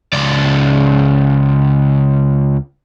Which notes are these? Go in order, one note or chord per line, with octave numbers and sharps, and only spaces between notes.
C#2 D5